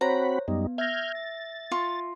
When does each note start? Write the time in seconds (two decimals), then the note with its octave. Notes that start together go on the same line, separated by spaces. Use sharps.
0.01 C4 F#4 C5 C#5 A#5 B5
0.48 F#2 G3 B3 D#4
0.78 E5 F6 G6 G#6 A#6
1.15 A6
1.71 F4 C#6